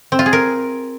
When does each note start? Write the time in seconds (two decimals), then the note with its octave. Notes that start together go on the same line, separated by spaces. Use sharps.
0.12 C4
0.19 F4
0.26 G#4
0.33 A#4